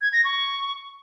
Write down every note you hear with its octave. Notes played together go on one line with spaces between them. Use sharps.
G#6
A#6
C#6